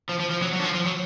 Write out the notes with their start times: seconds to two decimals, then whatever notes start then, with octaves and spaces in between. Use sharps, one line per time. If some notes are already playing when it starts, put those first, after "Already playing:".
0.09 F3
0.20 F3
0.31 F3
0.42 F#3
0.53 F#3
0.59 D3
0.64 F3
0.74 F3
0.86 F#3